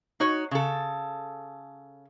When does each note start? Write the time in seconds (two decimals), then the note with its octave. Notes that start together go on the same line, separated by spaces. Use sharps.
0.20 D#4 F#4 C#5
0.51 C#3 A4